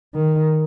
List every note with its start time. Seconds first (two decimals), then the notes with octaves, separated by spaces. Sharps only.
0.14 D#3